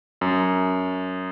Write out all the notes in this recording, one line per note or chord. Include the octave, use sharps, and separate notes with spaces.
F#2